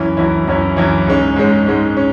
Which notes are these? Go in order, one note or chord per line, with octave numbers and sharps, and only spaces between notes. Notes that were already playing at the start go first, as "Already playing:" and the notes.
Already playing: F#2 E3 C#4 E4
F#2 E3 C#4 E4
F#2 E3 C#4 E4
F#2 E3 C#4 E4
G#2 G#3 C#4
G#2 G#3 C#4
G#2 G#3 C#4
C#4